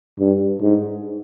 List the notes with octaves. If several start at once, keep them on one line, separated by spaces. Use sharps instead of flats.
G2
G#2